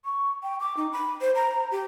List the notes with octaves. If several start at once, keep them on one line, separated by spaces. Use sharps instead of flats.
C#6
G5
D6
D#4
B5
C5
A#5
G4